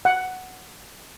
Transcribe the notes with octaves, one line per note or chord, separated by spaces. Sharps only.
F#5